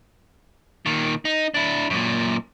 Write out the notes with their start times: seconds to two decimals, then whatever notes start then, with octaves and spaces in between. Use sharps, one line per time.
0.86 A#2 D#3
1.25 D#4
1.54 D4 E4
1.90 F#2 A#2